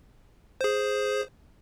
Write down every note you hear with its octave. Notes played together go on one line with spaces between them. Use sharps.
G#4 C5